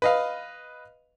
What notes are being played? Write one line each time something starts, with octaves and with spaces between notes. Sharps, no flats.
B4 D#5 F5